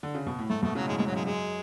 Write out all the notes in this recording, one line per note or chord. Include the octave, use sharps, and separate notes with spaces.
D3
C#3
B2
A2
G#2 A3
G#2 B2 A3
A2 C#3 F#3
F#2 A2 G#3
G#3
G#2
F#3
F#2 G#3
G#3